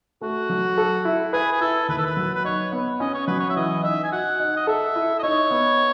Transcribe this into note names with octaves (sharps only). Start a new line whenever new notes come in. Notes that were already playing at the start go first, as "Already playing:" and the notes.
A3 F#4
F#3
A4
E4
G#4 B4
G#4
E4 A4
D#2 B4
A4
B4
F#3
B4
D#4 C#5
B3
C#4 D#5
C#5
F#3 B4
C#5
E5
E3 D#5
D#4 E5
G#5
F#4 F#5
D#4
D#5
A4 E5
E4
D#5
D#4 C#5
B3